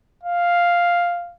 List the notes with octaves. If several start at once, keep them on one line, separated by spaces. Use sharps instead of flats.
F5